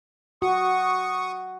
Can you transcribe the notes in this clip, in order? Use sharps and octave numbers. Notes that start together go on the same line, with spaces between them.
F#4 C#6 D#6